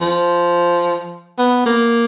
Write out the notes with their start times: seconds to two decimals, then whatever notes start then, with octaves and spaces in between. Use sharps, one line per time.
0.01 F3
1.38 B3
1.66 A#3